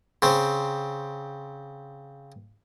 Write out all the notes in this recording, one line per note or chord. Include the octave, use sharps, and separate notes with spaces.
C#3 C4